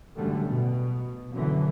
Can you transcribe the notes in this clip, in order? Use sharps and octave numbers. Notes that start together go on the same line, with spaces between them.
A1 F#2 D3 G3 A3
B2
F#1 F#2 D3 E3